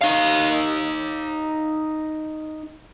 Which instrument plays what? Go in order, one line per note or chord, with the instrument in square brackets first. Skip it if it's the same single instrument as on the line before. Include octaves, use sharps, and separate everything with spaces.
[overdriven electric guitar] D#4 F5